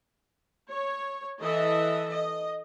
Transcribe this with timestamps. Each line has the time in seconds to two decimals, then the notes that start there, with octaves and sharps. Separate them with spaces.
0.69 C#5
1.40 E3 A4 D#5 E5
2.12 D#5